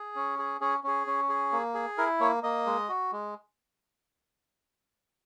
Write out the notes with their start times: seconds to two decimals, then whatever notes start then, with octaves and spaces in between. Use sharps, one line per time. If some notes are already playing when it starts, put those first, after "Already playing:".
Already playing: G#4
0.16 C#4
0.39 G#4
0.61 C#4 G#4
0.84 C#4 G#4
1.07 C#4
1.29 G#4
1.52 A#3
1.74 G#4
1.98 E4 A#4
2.20 A#3 C#5
2.43 A#3 D#5
2.66 G#3
2.89 F#4
3.12 G#3